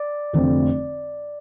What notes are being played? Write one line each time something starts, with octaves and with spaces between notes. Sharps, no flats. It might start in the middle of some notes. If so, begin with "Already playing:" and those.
Already playing: D5
F1 F2 D3 A3 C4